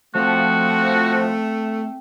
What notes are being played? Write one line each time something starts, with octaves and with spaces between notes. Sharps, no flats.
F3 A3 C4 F#4 G5